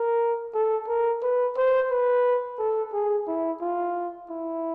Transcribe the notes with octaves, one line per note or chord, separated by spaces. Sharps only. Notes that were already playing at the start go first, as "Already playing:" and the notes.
Already playing: A#4
A4
A#4
B4
C5
B4
A4
G#4
E4
F4
E4